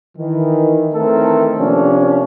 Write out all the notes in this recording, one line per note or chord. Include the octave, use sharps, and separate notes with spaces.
D#3 E3
D#3 E3 A3 C4 A4 A#4
C3 F3 A#3 C#4 D4